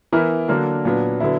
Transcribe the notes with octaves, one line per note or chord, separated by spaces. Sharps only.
E3 B3 E4 A#4
D3 F#3 A#3 D4 A#4
A#2 F#3 B3 D4
D3 F#3 B3 E4